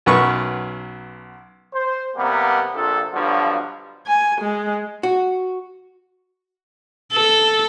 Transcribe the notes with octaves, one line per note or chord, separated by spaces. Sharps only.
B1 F#2 B4 C#6
C5
C3 G3 A#3 B3
A#1 C3 F3 A4
G2 B2 D3 F3 F#3
G#5
G#3
F#4
A4